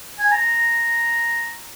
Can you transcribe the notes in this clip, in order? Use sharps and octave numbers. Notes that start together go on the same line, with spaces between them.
G#5
A#5